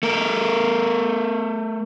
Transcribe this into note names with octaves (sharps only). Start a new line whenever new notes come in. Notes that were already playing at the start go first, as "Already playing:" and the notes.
A3 A#4